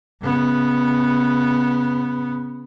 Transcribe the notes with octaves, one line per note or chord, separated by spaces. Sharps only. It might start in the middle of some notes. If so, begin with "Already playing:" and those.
C#3 B3